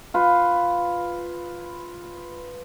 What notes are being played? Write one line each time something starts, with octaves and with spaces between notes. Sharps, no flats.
F4 B4